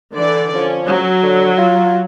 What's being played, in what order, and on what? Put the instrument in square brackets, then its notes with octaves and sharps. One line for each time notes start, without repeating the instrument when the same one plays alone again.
[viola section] D3 E3 D5
[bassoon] F3 [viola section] C#4
[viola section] F#3
[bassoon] D3
F4